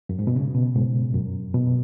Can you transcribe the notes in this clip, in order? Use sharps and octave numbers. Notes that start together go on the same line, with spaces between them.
F#2
G#2
B2
C#3
B2
G#2
F#2
B2